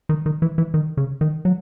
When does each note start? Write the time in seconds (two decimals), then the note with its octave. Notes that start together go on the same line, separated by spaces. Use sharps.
0.09 D#3
0.26 D#3
0.42 E3
0.58 E3
0.74 D#3
0.97 C#3
1.21 D#3
1.45 F#3